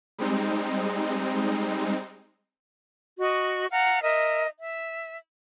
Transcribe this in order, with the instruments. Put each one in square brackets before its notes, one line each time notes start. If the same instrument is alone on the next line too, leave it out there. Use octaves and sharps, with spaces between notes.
[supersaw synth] G3 G#3 C4 D#4
[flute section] F#4 D#5 C#6
F5 F#5 A#5
A#4 D#5 E5
E5